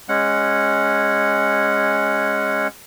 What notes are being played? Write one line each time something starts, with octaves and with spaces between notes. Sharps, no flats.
G#3 C#4 F#5